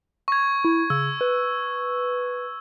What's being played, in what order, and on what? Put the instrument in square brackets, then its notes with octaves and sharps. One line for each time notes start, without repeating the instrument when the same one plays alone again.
[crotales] C#6 G#6
[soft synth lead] E4
[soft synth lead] C#3 [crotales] E6
[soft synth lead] B4